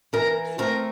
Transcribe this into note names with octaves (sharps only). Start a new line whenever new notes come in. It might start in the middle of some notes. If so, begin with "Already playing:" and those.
E3 A#4
A3 C4 A#4